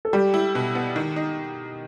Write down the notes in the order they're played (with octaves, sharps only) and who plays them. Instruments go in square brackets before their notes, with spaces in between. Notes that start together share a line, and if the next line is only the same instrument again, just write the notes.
[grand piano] A4
[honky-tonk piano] G3 [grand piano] G4
[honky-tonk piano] E4
B2
B3
D#3
D#4